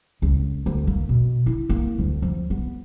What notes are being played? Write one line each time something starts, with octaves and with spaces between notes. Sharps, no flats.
C#2
D2
A#3
B2
E4
A#3
D2
F3
B3